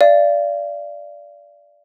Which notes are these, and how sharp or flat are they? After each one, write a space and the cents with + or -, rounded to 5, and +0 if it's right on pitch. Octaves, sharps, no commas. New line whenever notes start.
D5 -10 F5 -35